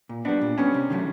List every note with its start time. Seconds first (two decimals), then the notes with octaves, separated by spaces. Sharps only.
0.09 A#2
0.25 B3 D4
0.28 G3
0.41 A#2
0.58 G3 B3 C#4
0.74 C3
0.90 D#3 F#3 A3